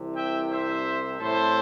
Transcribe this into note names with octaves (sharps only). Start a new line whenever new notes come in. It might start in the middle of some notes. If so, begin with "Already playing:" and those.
Already playing: C2 C3 E3
E5 G5
C5 E5
A2 G3 C4 E4 A4 C5